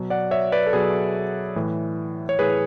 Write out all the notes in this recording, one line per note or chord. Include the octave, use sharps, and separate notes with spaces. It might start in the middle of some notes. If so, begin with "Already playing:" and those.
Already playing: B2 F#3
D5 F#5
C#5 E5
B4 D5
A4
B2 F#3 G#4 B4
A2 E3
C#5
A2 E3 G#4 B4